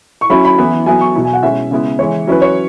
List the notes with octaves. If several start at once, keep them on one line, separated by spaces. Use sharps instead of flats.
C#6
F#3 C#4 E4 B5
B5
E3 B3 E4
F#3 B3 E4 G#5
C#6
B2 F#3 E4
G#5
F#5
B2 G#3 C#4 E4 E5
C#3 G#3 B3 E4
E3 G#3 E4 C#5
F#3 C#4 E4 B4
C#5